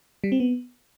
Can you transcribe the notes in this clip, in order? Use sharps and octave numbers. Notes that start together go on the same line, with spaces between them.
G3
C4
B3